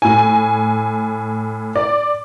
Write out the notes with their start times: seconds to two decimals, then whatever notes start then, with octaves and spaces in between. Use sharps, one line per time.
0.02 A2 G#5
1.76 D5